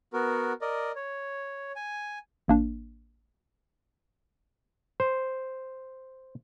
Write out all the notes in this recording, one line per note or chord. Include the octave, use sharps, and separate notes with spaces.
B3 F#4 A#4
A#4 D5 D#5
C#5
G#5
A1 A#3 D4
C5